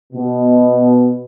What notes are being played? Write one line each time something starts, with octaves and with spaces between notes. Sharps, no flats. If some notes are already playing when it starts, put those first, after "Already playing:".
B2